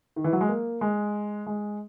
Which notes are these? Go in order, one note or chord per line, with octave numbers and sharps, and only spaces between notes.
D#3
E3
F#3
G#3
A#3
G#3
G#3